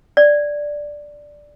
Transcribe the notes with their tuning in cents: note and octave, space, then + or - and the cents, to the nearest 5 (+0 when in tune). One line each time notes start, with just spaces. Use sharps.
D5 +0